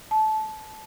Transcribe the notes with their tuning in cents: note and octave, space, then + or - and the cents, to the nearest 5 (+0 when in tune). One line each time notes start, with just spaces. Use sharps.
A5 -20